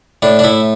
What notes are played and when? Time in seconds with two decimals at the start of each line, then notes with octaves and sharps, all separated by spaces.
0.22 A2 D4
0.39 D4
0.44 A2 E4